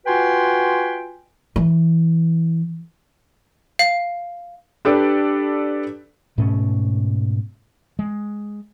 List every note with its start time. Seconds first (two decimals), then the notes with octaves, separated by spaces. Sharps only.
0.07 F4 F#4 B4 G5 G#5 C6
1.56 E3
3.79 F5
4.85 D4 G4 A4 B4 D5
6.38 G#2 B2 A3 C#4
7.99 G#3